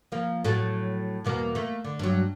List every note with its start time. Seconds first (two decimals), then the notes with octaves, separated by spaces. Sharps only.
0.12 F3 A#3
0.44 A2 F#3 A4
1.25 E2 B2 A#3
1.55 A3 A#3
1.84 D3
1.99 G2 F#3